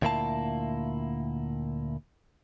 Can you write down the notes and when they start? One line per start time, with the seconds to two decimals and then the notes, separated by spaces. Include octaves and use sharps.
0.02 D2 A#2 A#3 E4 F5 A5